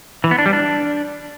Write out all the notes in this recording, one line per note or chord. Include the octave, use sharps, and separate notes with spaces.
E3
B3
D4
G3
D4